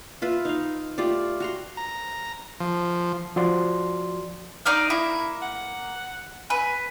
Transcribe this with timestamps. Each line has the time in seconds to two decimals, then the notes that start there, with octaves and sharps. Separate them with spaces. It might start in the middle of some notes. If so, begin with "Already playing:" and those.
0.22 F4 B4 E5
0.45 D#4 F5
0.98 A3 F4 G4 D5
1.40 F#4 A#5 C6
1.77 A#5
2.60 F3
3.36 F3 F#4 D5 C6
4.66 D#4 D5 F5
4.90 A#3 E4
5.42 F#5
6.50 B4 G#5